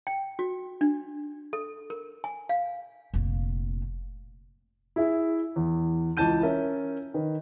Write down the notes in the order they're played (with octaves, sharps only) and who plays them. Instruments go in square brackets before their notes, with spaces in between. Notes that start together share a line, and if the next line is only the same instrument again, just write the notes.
[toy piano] G5
F#4
D4
A4
A#4
G#5
F5
[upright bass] F1 A#2
[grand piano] E4 G#4 E5
E2
C#2 E3 A5 G6 D#7
C#4 A#4 E5
D#3 B4